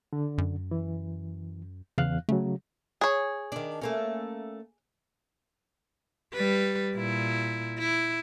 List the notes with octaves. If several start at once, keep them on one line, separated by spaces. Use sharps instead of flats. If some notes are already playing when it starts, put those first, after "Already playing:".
D3
F#2
E3
E2 C#3 F5 F#6
C#3 F#3 A3
G#4 C#5
D#3 D4
A3 A#3 C#4
G3 B4
A#2 E4
E4